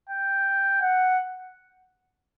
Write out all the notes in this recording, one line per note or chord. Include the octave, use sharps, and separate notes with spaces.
G5
F#5